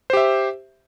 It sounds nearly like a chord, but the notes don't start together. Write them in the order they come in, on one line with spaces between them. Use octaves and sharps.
C5 G4 E5